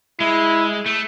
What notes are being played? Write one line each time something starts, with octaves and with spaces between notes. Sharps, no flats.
G#3 E4
A3